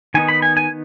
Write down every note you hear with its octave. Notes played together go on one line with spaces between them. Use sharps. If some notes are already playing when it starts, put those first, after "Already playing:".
D#3 B3 D#4 G#5
B5
G#5
G#5